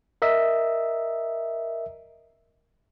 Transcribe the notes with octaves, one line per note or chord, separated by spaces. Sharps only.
A#4 D#5 E5